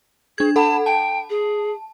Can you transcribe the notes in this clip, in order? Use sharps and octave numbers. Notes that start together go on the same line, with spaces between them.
D4 G#4 G#6
A4 F#5 A5 B5
G5 A5
G#4